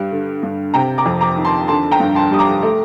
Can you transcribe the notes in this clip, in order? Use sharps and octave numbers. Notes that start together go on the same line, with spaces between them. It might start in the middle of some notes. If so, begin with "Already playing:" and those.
Already playing: G2 G3
D3
G2
C3 G5 A#5
A#5 D6
F2
A#5 D6
D#3
A5 C6
D3 A5 C6
G5 A#5
G2
A5 C6
G3 D#6
A#5 D6
A3